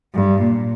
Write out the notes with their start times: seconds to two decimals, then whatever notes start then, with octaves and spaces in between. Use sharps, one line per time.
0.15 G2
0.44 A#2